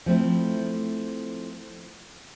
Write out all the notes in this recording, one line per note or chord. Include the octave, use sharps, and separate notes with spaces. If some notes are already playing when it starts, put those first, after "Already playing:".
F3 A3 C4 E4